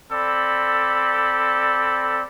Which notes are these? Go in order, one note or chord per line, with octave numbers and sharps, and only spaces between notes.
C4 A4 D5 B5